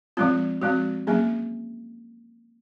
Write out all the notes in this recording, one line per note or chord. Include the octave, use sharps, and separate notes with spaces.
F3 G#3 C4 F4
F3 G#3 C4 F#4
F#3 A#3 C#4 G#4